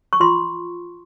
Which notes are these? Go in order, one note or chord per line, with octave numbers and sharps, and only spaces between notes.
C#6
F4 C6